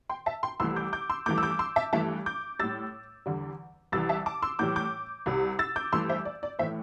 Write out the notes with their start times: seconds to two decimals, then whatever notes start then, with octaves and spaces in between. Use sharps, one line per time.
0.09 G5 C6
0.26 E5 A5
0.43 G5 C6
0.60 C2 C3 E3 A3 C6 E6
0.76 D6 G6
0.93 D6 G6
1.10 C6 E6
1.26 G2 E3 A3 D6 G6
1.38 E6
1.43 D6 G6
1.59 C6 E6
1.76 E5 A5
1.93 G2 E3 A3 E5 A5
2.26 D6 G6
2.59 A2 G3 E6 A6
3.26 E2 D3 G3
3.92 C2 C3 E3 E6 A6
4.09 E5 A5
4.26 A5 D6
4.42 C6 E6
4.59 A2 E3 G3 D6 G6
4.76 D6 G6
5.26 C2 C3 G3
5.59 E6 A6
5.76 D6 G6
5.92 G2 E3 A3 C6 E6
6.09 C5 E5
6.25 D5
6.43 D5
6.59 A2 E3 A3 C5 E5